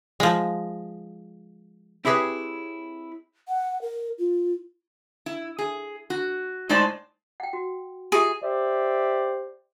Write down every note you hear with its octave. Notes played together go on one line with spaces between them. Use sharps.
F3 G#3
C4 E4 G4 G#4 B4 C#5
F#5
A#4
F4
E4
G#4
F#4
A2 G#3 D#4 C5 D5 A5
F#5 G5
F#4
F4 G4 G#4 E5
G4 C5 D5 E5